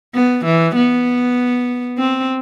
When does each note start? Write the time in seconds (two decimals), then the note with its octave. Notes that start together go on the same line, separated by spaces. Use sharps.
0.15 B3
0.45 E3
0.76 B3
1.98 C4